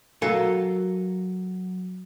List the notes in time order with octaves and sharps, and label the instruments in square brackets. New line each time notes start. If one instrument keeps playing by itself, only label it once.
[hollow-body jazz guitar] F#3 A4 A#4 F5 G#5